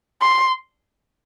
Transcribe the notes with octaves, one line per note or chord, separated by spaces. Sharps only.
C6